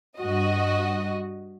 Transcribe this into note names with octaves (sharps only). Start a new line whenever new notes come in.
G2 F#4 D#5